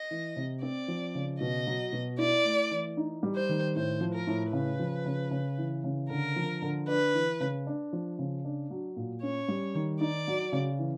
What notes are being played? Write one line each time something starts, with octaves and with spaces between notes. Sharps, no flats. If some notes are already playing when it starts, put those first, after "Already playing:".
Already playing: D#5
E3
C3
C4 D5
F3
C#3
B2 D#5
F#3
B2
E4 D5
A3
E3
D#4
G3
C5
D#3
A2 C5
F3
A#4
A2
C#3 B4
F3
C#3
C#3
E3
C#3
D3 A#4
F3
D3
D4 B4
E3
C#3
D4
F3
C#3
D4
F#3
A#2
C#4 C#5
G3
D#3
D#4 D5
F#3
C#3
E3